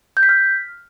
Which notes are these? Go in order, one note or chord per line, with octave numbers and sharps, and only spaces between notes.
G6
B6
F6